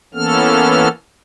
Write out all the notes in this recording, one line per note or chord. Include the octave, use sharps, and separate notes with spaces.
E3 A#3 B3 C#4 A4 F6